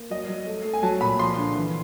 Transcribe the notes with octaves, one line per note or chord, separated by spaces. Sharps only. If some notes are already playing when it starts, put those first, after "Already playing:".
Already playing: A#3
F#3 D#5
F#3
A3
A3
G#5
F#3 A5
A#2 B5
F3 C6
D3
E3